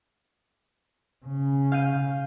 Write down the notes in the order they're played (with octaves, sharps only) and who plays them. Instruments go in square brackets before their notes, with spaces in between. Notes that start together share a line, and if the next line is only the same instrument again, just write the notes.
[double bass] C#3
[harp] F5 G6 D#7